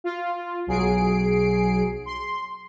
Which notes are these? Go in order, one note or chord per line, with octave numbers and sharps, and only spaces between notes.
F4
B1 F#3 G#4 C7 D7
C6